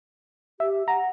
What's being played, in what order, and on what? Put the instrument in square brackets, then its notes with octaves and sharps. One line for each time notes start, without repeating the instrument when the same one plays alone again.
[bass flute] G4 [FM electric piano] E5
[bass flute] F#5 [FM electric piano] A#5